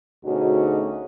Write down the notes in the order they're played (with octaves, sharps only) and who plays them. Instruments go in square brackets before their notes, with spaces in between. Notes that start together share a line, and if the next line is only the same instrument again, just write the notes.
[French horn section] D2 B2 C#4 D#4 F#4 G#4